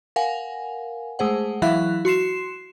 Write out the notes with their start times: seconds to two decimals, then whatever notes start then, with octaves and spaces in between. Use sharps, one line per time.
0.16 A#4 F5 F#5 G#5
1.19 G#3 A3 G#4 C5 F#5
1.62 E3 F#3 E4 E5 F5 F#6
2.05 F#4 C6 C7 E7